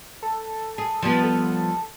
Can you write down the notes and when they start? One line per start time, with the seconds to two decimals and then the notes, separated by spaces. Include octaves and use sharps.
0.23 A4
0.78 G#4
1.02 F3 G3 B3 A5
1.24 A4